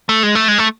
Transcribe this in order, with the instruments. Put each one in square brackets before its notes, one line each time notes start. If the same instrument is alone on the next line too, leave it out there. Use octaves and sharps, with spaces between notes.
[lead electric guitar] A3
G#3
A3
G#3
A3